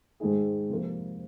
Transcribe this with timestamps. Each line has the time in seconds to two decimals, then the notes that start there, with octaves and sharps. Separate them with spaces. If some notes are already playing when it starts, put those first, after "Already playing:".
0.20 G#2 D#3 G#3 D#4 G#4
0.70 C3 F3 A#3